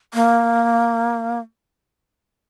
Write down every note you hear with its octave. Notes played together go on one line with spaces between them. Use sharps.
A#3